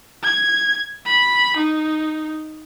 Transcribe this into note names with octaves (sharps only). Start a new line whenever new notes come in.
G#6
B5
D#4